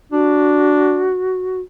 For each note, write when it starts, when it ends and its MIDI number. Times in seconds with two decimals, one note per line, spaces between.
0.12 1.11 62
0.12 1.61 66